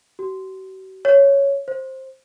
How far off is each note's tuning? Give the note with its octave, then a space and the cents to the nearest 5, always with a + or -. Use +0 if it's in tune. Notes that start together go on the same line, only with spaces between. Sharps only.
F#4 +45
C#5 +5
C5 +10